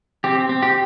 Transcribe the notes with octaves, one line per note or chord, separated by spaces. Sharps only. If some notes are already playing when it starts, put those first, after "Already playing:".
C4 G4
C4
G4